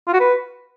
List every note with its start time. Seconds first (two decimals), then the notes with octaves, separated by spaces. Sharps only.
0.07 F4
0.14 F#4
0.20 B4